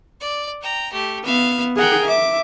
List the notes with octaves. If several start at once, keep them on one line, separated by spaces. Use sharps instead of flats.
D5
G5 A#5
A3 G4
B3 E5 F5
G#4 A#4 F#5 G5
E5 D6